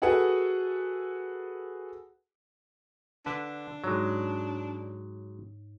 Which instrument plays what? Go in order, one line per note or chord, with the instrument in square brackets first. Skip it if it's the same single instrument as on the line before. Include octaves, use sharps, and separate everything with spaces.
[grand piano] F#4 G#4 A4 B4 F#5
[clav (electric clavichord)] D3 B4 [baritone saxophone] D4
[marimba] G#2 D#4 C#5 [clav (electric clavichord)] F#3 G#3